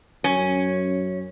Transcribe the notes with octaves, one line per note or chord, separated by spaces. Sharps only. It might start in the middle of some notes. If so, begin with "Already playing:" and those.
F#2 C#4